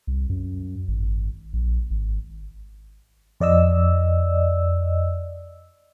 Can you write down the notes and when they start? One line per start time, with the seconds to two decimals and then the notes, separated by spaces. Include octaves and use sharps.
0.07 C2
0.29 F#2
0.88 G#1
1.53 A#1
1.90 G#1
3.40 F2 D5 D#5 E6